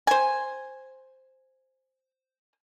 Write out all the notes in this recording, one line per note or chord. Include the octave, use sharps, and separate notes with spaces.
C5 G#5